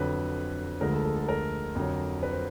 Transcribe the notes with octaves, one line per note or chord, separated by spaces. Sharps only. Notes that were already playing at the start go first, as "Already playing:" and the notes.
Already playing: F2 D3 F#3 B4
D2 D3 F3 G#3 A#4
A4
A4
A4
A#4
F2 D3 F#3
B4
C5